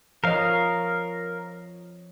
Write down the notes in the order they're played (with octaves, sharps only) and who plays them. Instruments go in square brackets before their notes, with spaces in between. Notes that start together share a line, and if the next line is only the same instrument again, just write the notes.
[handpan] F3 C#5 D#5 [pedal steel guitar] A#4 F5